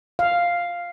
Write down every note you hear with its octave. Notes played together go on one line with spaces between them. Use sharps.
F5